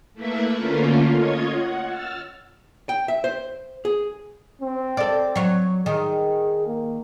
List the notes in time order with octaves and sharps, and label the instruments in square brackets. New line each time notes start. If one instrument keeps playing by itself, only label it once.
[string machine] A3 A#3 E4 B4 E5
D3 A3 A#3 C#4 F4
F4 C#5 D#5 G#6
F#5
E6 F6 A6
[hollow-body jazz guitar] G5
E5
C5
G#4
[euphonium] C4
[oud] A4 D5
F#3 C#5
[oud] D#3 [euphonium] G#4
[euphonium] A#3